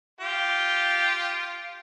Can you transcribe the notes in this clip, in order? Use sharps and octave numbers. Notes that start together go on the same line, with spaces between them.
F4 G4